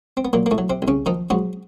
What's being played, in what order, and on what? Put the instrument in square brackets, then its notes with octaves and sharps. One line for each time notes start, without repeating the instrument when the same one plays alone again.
[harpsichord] C4
B3
A#2 F#3 A#3
A#3
A2 A3
F#3
C3 C4
C2
C#3 C#4
D#3 F3 D#4
G#2 F#3 F#4